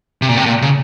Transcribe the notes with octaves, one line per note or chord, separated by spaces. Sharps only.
C3
A#2
C3
A#2
C#3